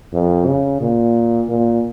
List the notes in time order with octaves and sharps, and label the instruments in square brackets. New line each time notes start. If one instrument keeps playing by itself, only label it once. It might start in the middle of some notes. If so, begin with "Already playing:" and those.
[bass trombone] F2
C#3
A#2
A#2